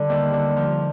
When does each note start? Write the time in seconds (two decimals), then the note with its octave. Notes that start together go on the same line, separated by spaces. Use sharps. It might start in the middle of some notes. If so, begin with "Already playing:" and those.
Already playing: D3 G3
0.10 D#2
0.33 D3
0.57 F3